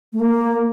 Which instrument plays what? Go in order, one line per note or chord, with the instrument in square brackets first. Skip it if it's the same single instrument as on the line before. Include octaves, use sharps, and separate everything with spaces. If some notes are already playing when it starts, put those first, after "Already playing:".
[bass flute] A3
A#3